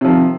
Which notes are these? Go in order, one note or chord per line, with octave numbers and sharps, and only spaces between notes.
C3 D#3 F3